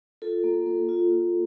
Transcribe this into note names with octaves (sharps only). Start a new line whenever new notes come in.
F4 A4
A#3
A#3
F4
F4